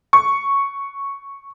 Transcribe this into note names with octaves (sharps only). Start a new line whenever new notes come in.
C#6